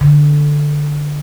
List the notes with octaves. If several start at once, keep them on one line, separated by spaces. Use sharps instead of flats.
D3